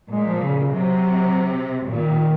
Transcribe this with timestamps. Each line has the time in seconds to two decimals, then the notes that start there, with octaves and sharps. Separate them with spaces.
0.12 A#2 G#3
0.27 F3
0.42 C#3
0.56 C#3
0.70 C3 F#3
1.87 A#2 D#3